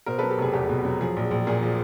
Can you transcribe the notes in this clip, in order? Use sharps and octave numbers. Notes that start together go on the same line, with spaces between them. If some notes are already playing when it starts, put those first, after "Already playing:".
B2 A#4 C5
F#3 A4 B4
G4 A4
F1 G#4
E2 G4
B2
F#3
F3 G#4
A#1
A#1
A#2 G#4
F3